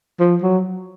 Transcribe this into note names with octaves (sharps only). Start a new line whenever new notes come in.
F3
F#3